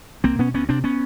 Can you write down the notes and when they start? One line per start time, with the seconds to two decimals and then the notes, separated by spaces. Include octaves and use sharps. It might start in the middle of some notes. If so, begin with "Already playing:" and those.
0.24 C2 A#3 C4
0.39 B2 B3 C#4
0.54 D2 B3 C#4
0.69 C3 C4 D4
0.84 B3 C#4